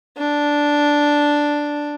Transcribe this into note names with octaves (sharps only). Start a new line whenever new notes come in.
D4